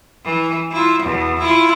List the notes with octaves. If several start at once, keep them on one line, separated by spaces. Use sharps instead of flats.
E3
E4 F4
E2 B2
E4 F4